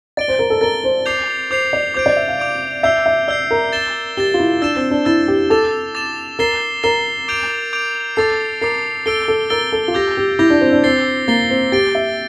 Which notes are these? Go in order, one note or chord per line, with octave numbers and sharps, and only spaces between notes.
D5 A6 D7 G7
C5
A#4
A4
A#4 A6 D7 G7
C5
D6 G6 C7 F7
C5 D6 G6 C7 F7
D5
C5 D6 G6 D7
D5
E5
F5
D6 G6 D7
E5 E6 G6 C7
E5
D5 E6 G6 C7
A#4
A6 E7 G7
G4 A6 E7 G7
F4
E4
D4 E6 A6 E7
C4
D4
E4 E6 A6 E7
G4
A4 D6 A6 E7
D6 A6 E7
A#4 A6 C7 E7 G7
A#4 A6 C7 E7 G7
D6 G6 D7 F7
D6 G6 D7 F7
A4 D6 A6 C7
A#4 D6 A6 C7
A4 E6 A6 D7 G7
A4
A#4 E6 A6 D7 G7
A4
F4
G4 D6 G6 A#6
G4
E4 D6 G6 A#6
D4
C4
D4
C4 A6 C7 G7
A#3 A6 C7 G7
C4
G4 A6 D7 G7
E5